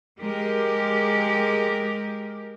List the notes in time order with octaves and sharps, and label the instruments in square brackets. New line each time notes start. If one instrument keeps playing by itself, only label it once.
[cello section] G#3 G4 A#4